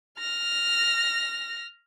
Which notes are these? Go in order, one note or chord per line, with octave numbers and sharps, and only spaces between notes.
F6 A#6